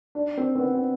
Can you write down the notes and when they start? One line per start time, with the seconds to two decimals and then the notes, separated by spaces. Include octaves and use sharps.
0.15 D4
0.37 C4
0.56 C4
0.59 B3
0.74 C4